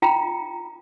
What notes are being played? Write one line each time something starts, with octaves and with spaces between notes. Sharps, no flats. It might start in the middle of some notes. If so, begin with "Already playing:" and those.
F4 G5 A#5